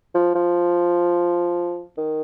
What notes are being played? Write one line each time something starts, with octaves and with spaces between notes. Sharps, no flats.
F3
F3
D#3